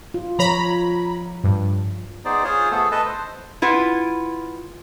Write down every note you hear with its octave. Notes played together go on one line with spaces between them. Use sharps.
F4
F3 C#5 A#5 B5
G2
B3 D#4 G#4 C5 D5
F4 G#4 C5 C#5
A3 B3 G#4 A4
A4 B4 D#5 A5
C5
E4 F4 B4 F#5